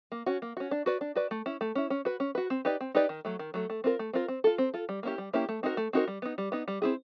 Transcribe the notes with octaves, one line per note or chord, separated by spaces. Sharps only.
A#3
C#4 F#4
A#3
C#4 F#4
D4
F#4 B4 D5
D4
F#4 B4 D5
A3
C#4 E4
A3
C#4 E4
C#4
F#4 B4
C#4
F#4 B4
C4
D#4 G4 B4 D5
C4
D#4 G4 B4 D5
D#3
F#3 A3
D#3
F#3 A3
A3
C4 F4 A#4
A3
C4 F4 A#4
C4
F4 A4
C4
F4 A4
G3
A#3 C#4 E4 G4
G3
A#3 C#4 E4 G4
A3
C4 D#4 F#4 A#4
A3
C4 D#4 F#4 A#4
G3
B3 D#4
G3
B3 D#4
G3
C4 E4 G#4